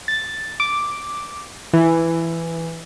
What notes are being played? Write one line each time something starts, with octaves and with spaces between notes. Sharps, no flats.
A6
D6
E3